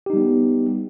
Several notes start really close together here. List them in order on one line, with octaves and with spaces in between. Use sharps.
G4 D#4 G3 B3